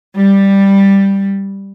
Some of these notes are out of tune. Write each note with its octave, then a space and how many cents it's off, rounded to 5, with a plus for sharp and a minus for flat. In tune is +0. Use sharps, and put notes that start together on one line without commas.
G3 +5